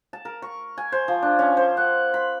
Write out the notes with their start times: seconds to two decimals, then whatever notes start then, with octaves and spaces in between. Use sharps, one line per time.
0.13 A5
0.25 A#4
0.42 C#6
0.78 G#5
0.92 C5
1.08 F3
1.22 D4
1.39 C#4
1.57 C5
1.77 F#5
2.14 B5